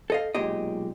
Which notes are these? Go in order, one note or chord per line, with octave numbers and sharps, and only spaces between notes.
A4 D#5 F5
B1 A#2 G#3 G4 D#5